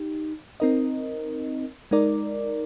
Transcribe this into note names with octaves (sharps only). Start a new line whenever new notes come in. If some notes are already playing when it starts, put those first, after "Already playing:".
Already playing: D#4 G4
C4 D#4 A#4 D#5
G#3 D#4 A#4 D5